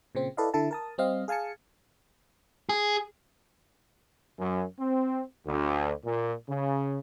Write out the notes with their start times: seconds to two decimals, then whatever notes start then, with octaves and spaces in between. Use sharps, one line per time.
0.15 A#2 C#3 C4
0.37 E4 A4 B4 D5 D#5 F5
0.54 D3 E4 A4 A5
0.71 A#4 A5 D#6
0.98 G3 C4 D#5 F5
1.28 G#4 F5 G#5 A5 C#7
2.69 G#4
4.39 F#2
4.79 C4
5.47 D2
6.04 A#2
6.48 C#3